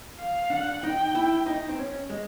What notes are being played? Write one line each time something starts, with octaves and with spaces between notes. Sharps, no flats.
F5
D4 F#5
D#4 G5
E4
D#4
C4
C#4
G#3